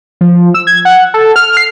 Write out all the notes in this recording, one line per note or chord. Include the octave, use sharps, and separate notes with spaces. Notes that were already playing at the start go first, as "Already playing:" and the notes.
F3
E6
G#6
F#5
A4
F6
C7